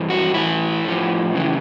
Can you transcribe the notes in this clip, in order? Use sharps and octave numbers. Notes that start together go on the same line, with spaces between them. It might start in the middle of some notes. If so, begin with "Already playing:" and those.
Already playing: G2 E3
F#4
A2 E3 E4
A2 F3
F#2 C#3 E3